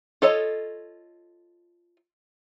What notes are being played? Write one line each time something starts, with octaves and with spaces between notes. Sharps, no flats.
F4 A4 C#5 D#5